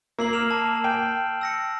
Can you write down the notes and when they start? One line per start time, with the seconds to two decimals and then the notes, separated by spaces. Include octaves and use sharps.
0.19 A#3 E6 C7 F#7
0.33 F6 E7 F7
0.51 A5
0.84 G5
1.41 E6 A#6 C#7